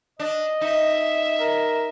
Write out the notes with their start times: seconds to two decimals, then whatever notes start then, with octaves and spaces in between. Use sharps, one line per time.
0.19 D4 D#5
0.61 D#4 E5
1.39 A#4